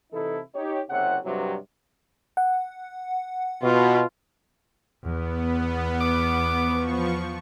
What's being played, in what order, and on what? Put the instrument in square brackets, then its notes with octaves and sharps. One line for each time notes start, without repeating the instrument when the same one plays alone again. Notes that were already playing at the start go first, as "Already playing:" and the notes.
[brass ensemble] C3 E3 D#4 E4 A4
D#4 G4 C#5
F#1 C3 C#5 F#5
G2 C3 F#3
[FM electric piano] F#5
[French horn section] B2 [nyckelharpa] F4
[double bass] E2 [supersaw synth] B3
[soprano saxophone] D6
[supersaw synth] F3 C#6
[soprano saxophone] B3